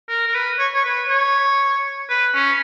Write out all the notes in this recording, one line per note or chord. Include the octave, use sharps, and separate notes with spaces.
A#4
A#4
B4
C#5
C#5
B4
C#5
B4
C#4